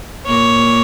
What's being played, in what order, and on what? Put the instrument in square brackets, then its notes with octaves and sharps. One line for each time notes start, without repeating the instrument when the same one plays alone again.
[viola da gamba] A#2 A#3 [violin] C#5